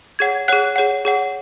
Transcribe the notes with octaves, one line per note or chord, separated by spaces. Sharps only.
G#4 C#5 F#5 G#6
G#4 C#5 F#5 F#6
G#4 C#5 F#5
G#4 C#5 F#5